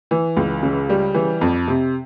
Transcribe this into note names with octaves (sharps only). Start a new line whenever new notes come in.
E3
C#2
C#3
G3
E3
F2
C3